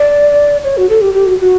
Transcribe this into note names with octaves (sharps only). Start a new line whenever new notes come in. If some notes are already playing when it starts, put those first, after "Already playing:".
Already playing: D5
C#5
F#4
A4
G4
G4
F#4
F#4